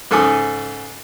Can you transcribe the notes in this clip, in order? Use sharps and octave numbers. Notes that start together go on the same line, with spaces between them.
G#2 C#3 A4 G#5 D6 D#6